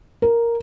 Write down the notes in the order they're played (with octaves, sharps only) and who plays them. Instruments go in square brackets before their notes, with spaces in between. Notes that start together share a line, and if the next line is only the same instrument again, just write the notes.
[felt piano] A#4